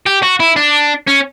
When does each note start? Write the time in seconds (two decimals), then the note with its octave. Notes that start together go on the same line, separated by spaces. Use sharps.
0.06 G4
0.23 F#4
0.40 E4
0.56 D4
1.08 C#4